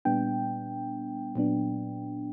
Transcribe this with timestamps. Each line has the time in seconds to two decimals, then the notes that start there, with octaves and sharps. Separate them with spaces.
0.05 A#2 G3 B3 D4 G5
1.36 A#2 F#3 B3 D4